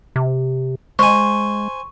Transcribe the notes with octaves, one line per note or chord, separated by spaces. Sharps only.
C3
G#3 C5 G#5 C#6